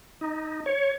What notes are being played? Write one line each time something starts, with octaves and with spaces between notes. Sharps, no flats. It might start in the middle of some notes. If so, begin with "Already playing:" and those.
D#4
C#5